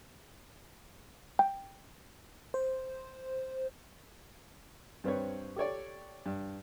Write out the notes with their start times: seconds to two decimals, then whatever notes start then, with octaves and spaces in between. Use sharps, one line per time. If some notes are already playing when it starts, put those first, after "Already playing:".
1.39 G5
2.54 C5
5.04 G2 C4 B4 C#5
5.56 G4 A4 C#5 D5
6.26 G2